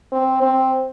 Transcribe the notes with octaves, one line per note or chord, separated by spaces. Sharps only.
C4
C4